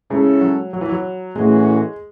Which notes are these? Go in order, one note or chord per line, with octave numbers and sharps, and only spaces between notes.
C#3 G#3 C#4 E4 A4
F#3
F#3
E3
F#3
A2 E3 G#3 A3 C#4 F#4